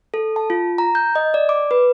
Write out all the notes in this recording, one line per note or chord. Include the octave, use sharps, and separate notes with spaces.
A4
A5
F4
A#5
G6
D#5
D5
D6
B4